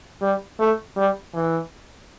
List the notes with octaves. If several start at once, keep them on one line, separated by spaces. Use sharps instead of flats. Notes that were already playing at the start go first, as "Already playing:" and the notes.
G3
A3
G3
E3